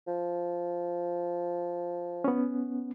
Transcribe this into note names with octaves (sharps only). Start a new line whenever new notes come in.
F3
B3 C#4